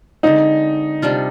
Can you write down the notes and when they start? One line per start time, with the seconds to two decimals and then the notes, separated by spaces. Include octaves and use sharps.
0.23 D3 G#3 C4 D#4
1.02 C3 G3 D4 F4